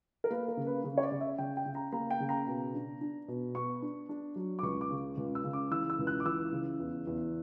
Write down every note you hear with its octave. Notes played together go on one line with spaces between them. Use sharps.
A#4
A#3 B4
A#4
C#3
B4
C#3
C#5
D5
C#3
E5
C#3 G5
G5
C#3
A#5
A#3 A#5
G5
C#3
A#5
B2
D4
D4
B2
B3 C#6
D4
D4
F#3
D6
C#2 C#6
D6
C#3
C#2
E6
C#3
D6
E3 E6
E6
C#2
F#6
D6
E3 E6
C#3
E2
E2